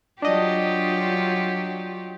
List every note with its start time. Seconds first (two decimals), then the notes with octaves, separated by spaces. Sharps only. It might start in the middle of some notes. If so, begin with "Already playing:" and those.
0.22 F#3 D4 F4 G4 D#5